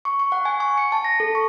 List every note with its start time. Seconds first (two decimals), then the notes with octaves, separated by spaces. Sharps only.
0.05 C#6
0.19 C#6
0.32 F#5
0.45 G#5
0.60 C#6
0.78 C#7
0.92 A5
1.05 A#6
1.20 A4
1.35 C#6